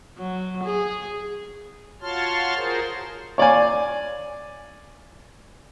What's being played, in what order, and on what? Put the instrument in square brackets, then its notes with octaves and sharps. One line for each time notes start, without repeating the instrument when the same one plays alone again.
[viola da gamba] F#3
G#4
[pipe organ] F4 F#4 C#5 A5 C6 F6
F4 F#4 G#4 A#4 C5
[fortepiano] C#5 D5 F5 G#5